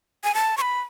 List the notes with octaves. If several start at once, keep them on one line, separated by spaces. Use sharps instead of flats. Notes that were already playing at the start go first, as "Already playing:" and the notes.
G#5
A5
C#6
B5